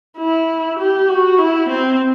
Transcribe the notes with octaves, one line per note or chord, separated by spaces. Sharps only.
E4
G4
F#4
E4
C4